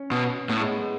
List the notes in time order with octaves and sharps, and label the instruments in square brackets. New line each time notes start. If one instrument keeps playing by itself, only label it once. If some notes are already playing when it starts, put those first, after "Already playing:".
Already playing: [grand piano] C#4
[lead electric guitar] B2
[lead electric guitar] A2 [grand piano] B3
[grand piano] G#3
G#3